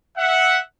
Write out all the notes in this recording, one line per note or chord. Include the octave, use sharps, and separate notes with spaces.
E5 F#5